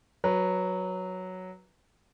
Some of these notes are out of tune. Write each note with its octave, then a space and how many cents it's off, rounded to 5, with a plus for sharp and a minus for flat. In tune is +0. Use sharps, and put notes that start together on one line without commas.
F#3 +0 B4 -10